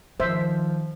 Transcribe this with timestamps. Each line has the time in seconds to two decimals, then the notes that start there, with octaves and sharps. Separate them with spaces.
0.20 D#3 F3 C5 E5